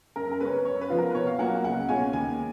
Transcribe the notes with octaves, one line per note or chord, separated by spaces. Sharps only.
F#2 A#4
A#4
C#3 G#3 C#4 B4
F#2 C#5
B4
F3 B3 F4
A#4
B4
B2 C#5
F5
F#3 A#3 F4 F#5
C#2 F#5
B2 G#3 C#4 F4 G#5
D#2 G#5